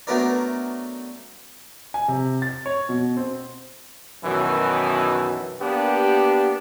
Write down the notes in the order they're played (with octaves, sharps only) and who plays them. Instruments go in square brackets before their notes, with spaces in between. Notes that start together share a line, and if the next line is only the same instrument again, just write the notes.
[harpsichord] F#3 A3 B3 D4 A#4 D5
[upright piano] G#5
C3
A6
C#5
B2
C4
[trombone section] F#2 B2 D#3 E3 F#3
A#3 B3 D4 G4